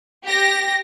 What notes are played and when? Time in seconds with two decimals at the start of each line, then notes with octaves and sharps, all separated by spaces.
0.25 G4 A#6